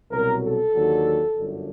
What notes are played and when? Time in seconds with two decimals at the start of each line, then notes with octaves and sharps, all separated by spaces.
0.11 C2 B2 F#3 A#4
0.42 A4
0.72 D#2 D3 F#3
1.34 G1 F#2 D3